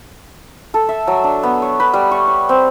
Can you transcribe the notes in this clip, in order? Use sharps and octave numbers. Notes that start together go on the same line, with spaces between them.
A4
E5
F#3
D4
B3
C#5
B4
G3
C#6
C#5
C4